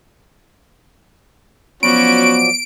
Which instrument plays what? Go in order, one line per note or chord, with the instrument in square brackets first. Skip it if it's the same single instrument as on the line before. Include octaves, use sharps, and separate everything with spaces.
[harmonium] F3 F#3 D5 [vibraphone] B3 [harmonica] C#4 F#4 [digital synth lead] D7